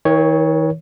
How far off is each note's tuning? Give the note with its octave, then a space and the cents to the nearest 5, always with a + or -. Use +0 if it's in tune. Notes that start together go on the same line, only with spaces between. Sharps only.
D#3 +45 A#4 +0 C#5 +0